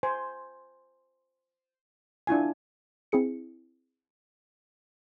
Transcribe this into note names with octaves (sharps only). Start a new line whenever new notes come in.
C5 G#5
D4 E4 F4 G#5
C4 E4 G#4 C#7